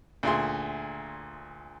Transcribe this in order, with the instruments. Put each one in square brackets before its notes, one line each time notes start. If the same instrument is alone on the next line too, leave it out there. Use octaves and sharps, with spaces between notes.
[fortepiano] D2 A#2 G#4 E5 C6